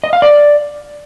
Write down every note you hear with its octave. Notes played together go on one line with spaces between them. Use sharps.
D#5
F5
D5